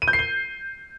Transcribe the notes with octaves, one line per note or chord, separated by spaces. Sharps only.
D#7
G6
C7
G7